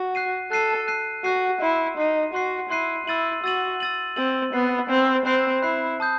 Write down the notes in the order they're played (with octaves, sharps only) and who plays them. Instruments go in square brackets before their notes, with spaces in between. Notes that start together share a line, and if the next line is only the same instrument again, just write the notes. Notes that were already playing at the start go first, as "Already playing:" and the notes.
Already playing: [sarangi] F#4
[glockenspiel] F#6 C7 D#7
[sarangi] A4 [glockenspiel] F#6 C7 D#7
[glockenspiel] F#6 C7 D#7
[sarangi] F#4 [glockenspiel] F#6 C7 D#7
[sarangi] E4 [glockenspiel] C6 F#6 C7 D#7
[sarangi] D#4 [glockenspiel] C6 F#6 C7 D#7
[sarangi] F#4 [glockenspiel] C6 F#6 C7 D#7
[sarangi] E4 [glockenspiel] C6 F#6 C7 D#7
[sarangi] E4 [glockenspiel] E6 A6 D#7 F#7
[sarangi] F#4 [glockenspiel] E6 A6 D#7 F#7
[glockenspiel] E6 A6 D#7 F#7
[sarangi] C4 [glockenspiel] E6 A6 D#7 F#7
[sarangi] B3 [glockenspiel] B5 F#6 C7
[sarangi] C4 [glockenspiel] B5 F#6 C7
[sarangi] C4 [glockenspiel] B5 F#6 C7
[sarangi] E4 [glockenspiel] B5 F#6 C7
[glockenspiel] A5 D#6 G6